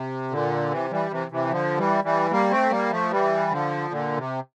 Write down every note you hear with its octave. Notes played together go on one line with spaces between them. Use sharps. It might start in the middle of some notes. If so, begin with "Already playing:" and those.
Already playing: C3
A#2 D3
C3 E3
E3 G3
C3 E3
C3 E3
D3 F3
E3 G3
E3 G3
G3 A#3
A3 C4
G3 A#3
F3 A3
E3 G3
D3 F3
A#2 D3
C3